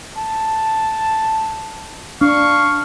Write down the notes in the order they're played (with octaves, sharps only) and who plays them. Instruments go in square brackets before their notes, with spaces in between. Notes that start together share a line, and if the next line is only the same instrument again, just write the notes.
[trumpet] A5
[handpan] D4 [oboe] F5 [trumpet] C#6